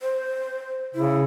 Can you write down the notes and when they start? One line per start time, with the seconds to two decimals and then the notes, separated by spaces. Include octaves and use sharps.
0.01 C5
0.95 C#3 E4